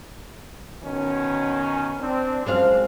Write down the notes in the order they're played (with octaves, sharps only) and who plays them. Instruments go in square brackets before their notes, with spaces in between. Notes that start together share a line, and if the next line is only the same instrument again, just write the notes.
[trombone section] B2 D#3 C#4
C4 D4
[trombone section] F#2 F3 [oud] G#3 C4 F5